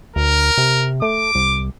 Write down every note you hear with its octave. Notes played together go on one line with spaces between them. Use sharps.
D2 A#4
C3
A3 D6
C2